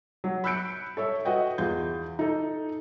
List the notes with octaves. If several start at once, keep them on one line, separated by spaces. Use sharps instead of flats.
F#3
B5 E6 F#6 G6 C#7 D7
A4 C#5 E5
F#4 B4 D#5 G5
E2 F4 G6
D#4 A4